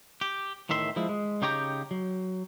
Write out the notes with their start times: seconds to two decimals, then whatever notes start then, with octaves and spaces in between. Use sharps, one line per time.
0.21 G4
0.69 E2 A2 D#3 E5 C6
0.96 F3 G#3 E4
1.09 G#3
1.42 C#3 D#4 G4 C#5 G5 A#5
1.91 F#3